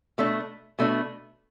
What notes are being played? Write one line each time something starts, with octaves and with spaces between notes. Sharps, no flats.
B2 A3 D4
B2 A3 D4